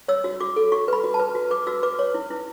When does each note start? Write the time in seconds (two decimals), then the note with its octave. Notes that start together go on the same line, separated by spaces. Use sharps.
0.08 C#5 E6
0.24 F#4
0.40 F#4 D6
0.56 A4
0.72 F#4 C#6
0.88 B4 B5
1.04 F#4
1.14 A5
1.19 B4
1.35 F#4
1.51 B4 D6
1.67 F#4 E6
1.83 B4 D6
1.99 C#5
2.14 E4
2.31 E4